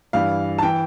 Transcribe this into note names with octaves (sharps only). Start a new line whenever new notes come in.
G2 E3 F5
A5
E3 G5